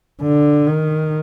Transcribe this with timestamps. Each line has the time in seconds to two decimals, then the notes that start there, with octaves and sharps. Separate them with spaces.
0.21 D3
0.67 D#3